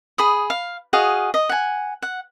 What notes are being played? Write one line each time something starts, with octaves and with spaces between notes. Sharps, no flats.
G#4 B5 D#6
F5
F#4 G#4 D#5 F5
D#5
F#5 G#5
F#5